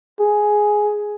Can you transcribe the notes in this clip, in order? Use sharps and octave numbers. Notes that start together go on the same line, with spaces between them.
G#4